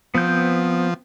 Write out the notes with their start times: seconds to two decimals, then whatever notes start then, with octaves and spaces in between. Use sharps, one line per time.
0.15 F3 B3 C4 G6